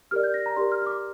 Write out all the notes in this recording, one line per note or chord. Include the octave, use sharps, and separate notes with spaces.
G4 A#4 D5 F6
G6
A#6
A#5
G4 A#4 D5 C6
F6
F6
D6